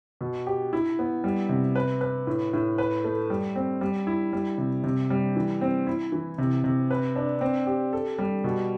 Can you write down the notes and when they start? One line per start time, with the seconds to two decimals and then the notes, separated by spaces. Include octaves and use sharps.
0.21 B2
0.47 G4
0.73 E4
0.99 B3
1.24 G3
1.49 C3
1.76 B4
2.01 B4
2.27 A2
2.53 A2
2.78 B4
3.04 A3
3.30 G3
3.56 C4
3.81 G3
4.07 E4
4.33 G3
4.58 C3
4.84 C3
5.10 G3
5.36 E3
5.61 C4
5.87 E4
6.12 E3
6.38 C3
6.64 C3
6.91 B4
7.16 D4
7.41 C4
7.67 G4
7.93 A4
8.18 G3
8.44 B2